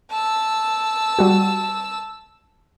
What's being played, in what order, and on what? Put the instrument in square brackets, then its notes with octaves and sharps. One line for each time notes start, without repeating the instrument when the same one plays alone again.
[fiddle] A5 E6
[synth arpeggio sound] G3 F#4